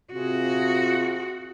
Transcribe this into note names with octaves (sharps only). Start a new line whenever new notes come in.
C3 F4 F#4 G#4